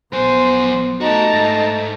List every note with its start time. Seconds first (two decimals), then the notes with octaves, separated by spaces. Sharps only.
0.13 A#1 F#3 B3 C5 G#5
1.01 A3 D#4 F#4 G4 A5 A#5
1.34 G#2